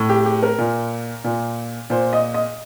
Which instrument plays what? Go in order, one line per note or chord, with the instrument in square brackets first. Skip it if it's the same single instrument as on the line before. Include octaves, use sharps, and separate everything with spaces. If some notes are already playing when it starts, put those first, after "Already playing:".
Already playing: [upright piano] A2
G4
G4
A#4
A#2
A#2
A#2 C5
D#5
D#5